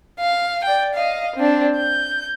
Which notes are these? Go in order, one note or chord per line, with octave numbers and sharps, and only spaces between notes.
F5
D5 G5
D#5 F5
C4 D4
G6